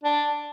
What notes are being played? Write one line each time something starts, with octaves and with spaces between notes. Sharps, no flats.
D4